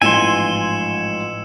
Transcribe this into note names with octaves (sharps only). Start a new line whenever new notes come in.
A1 G#2 F3 G#5 C6 E6 C#7 E7